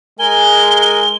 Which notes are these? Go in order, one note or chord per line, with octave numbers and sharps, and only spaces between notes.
G#3 A#4 G#5 G7